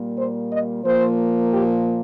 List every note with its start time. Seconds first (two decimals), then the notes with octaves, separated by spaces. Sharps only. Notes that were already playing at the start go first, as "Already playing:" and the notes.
Already playing: A#2 G3 A#3
0.17 C5
0.51 D#5
0.84 A#2 F3 A#3 C5
1.52 G4